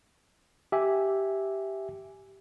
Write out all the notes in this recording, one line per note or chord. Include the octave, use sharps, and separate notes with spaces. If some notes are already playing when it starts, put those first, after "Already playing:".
G4 E5 G#5